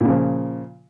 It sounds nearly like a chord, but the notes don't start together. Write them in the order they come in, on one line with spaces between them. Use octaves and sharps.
A#2 C#3 F3